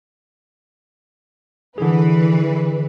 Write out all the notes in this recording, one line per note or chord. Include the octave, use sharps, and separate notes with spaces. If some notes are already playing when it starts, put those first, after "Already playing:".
D3 E3 G#4 B4